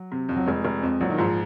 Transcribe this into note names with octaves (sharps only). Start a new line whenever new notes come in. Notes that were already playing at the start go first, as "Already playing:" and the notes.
Already playing: F#3
C3
F2
F#3
F1 G#3
F1
F2
A#1 F#3
D#3
G#2 F3